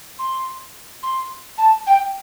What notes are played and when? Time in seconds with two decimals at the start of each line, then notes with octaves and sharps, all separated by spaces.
0.19 C6
1.03 C6
1.58 A5
1.87 G5